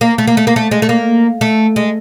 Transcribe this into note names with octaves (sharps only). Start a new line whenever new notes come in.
A#3
A3
A#3
A3
A#3
A3
G#3
A3
A#3
A3
G#3